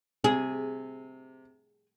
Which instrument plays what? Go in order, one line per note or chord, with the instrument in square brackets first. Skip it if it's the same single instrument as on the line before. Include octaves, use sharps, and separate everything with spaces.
[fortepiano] C3 [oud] G#4